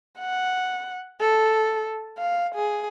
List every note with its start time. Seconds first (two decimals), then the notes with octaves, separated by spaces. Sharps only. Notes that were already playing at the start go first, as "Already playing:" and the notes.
0.19 F#5
1.20 A4
2.18 F5
2.55 G#4